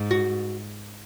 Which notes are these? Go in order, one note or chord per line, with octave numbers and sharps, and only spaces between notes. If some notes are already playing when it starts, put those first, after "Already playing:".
Already playing: G#2
F#4